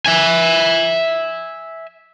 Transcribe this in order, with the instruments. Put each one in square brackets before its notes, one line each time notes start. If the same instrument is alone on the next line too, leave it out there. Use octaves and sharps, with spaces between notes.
[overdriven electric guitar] E5 G#5